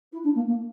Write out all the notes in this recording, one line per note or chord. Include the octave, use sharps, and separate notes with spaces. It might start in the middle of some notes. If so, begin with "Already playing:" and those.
E4
D4
A#3
A#3